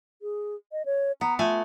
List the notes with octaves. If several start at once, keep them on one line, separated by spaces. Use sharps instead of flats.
G#4
D#5
C#5
B3 A#5
A3 F4 G#5